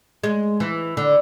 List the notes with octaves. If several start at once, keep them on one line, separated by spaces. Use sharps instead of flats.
G#3
E3
D3